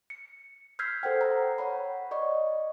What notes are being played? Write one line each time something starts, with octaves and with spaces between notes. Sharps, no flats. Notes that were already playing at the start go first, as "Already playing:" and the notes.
C#7
E6 F6 G6 G#6 B6 C7
A4 C5 F#5 G5
A#5
C#5 F#5 B5
D5 D#5 C#6